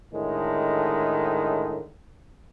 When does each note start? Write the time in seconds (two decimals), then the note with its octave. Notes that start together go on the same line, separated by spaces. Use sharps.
0.12 A2 D3 D#3 G#3